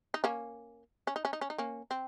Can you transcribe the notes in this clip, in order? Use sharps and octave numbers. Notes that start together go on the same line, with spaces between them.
D#4
A#3 C#4
C#4
D#4
C#4
D#4
C#4
D#4
A#3 C#4
C4